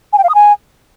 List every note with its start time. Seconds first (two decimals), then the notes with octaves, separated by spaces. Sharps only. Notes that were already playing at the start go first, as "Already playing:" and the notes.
0.13 G#5
0.18 G5
0.24 F5
0.29 D#6
0.35 G#5